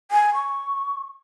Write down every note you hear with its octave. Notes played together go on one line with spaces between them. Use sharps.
G#5
C#6